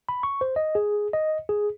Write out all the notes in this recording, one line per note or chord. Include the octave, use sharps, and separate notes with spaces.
B5
C#6
C5
D#5
G#4
D#5
G#4